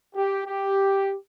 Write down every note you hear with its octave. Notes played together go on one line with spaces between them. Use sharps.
G4
G4